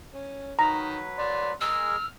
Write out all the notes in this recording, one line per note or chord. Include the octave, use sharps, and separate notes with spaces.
C#4
D#3 F#3 B4 A#5
D5 C6
G#3 G#4 A#4 E6 F6